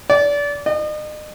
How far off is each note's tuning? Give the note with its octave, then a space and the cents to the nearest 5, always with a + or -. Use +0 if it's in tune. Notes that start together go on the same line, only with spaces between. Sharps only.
D5 -25
D#5 -40